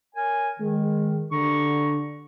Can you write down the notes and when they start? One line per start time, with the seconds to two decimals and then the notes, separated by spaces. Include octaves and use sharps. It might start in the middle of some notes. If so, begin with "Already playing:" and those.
0.16 A#4 C#5 G#5
0.60 D#3 G#3
1.32 D3 G4 A#5 C#6